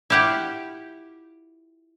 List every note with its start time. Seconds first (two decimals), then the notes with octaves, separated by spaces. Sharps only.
0.10 E4 F4 G4 F#5 G5